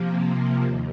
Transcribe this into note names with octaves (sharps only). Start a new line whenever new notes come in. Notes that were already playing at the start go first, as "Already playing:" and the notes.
Already playing: C3 F3 A#3
D#2